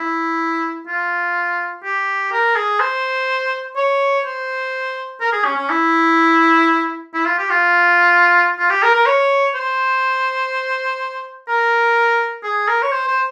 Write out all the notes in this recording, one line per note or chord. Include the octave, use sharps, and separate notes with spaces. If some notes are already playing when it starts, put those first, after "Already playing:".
Already playing: E4
F4
G4
A#4
G#4
C5
C#5
C5
A#4
G#4
C#4
C#4
E4
E4
F4
G4
F4
F4
G4
A#4
A#4
C#5
C5
A#4
G#4
A#4
C#5
C5
C5